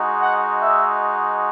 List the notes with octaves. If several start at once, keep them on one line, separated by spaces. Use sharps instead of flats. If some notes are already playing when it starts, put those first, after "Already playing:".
Already playing: G#3 D#4 F#4
F#5
E5